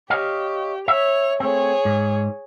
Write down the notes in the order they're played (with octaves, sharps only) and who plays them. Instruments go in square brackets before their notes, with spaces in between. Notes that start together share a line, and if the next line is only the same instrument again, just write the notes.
[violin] G4 [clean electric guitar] C#5 D#5 F5
[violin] C#5 F7 [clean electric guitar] E5
[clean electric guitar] A3 C4 [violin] G#4 C#5
[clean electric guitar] G#2